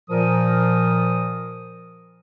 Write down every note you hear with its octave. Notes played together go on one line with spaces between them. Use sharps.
A#2 F3 A#4 D#6